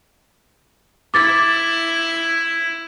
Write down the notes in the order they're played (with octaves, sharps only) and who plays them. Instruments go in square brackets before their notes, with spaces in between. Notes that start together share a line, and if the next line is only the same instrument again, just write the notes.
[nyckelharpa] E4 [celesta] D6 A6